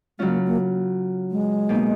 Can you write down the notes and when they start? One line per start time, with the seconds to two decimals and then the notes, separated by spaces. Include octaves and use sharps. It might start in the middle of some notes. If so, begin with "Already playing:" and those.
0.19 C#3 F#3 G#3 C#4 F4
0.28 A#3
0.47 A#3
1.31 G#3
1.69 B2 A#3 D#4